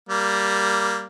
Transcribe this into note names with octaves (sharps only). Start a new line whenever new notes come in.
G3 A#3